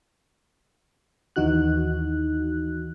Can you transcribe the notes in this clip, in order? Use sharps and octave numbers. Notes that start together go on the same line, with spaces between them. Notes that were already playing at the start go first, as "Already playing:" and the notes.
D#2 E3 D#4 F#4 F#6